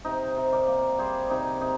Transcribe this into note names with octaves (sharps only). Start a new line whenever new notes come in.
C3 D#4
C3
A#4 D5
A#3
G3 G#4 C5
C3 D#4
C3 D#4